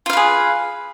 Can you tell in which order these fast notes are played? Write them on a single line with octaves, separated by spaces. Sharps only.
F4 F5 B4 G#4